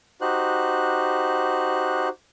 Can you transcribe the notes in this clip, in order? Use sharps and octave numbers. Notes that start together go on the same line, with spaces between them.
D#4 F#4 G4 C5 F#6